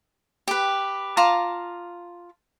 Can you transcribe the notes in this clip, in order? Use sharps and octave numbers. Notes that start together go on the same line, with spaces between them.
G4 B4
F4 A5 A#5 D6